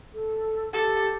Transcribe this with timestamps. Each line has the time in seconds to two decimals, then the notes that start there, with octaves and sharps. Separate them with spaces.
0.14 A4
0.73 G4 A4